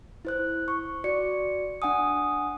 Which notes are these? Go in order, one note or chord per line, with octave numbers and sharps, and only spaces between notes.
E4 C5 F#6
C#6
F#4 D5 C#7
D4 F#5 G#5 D#6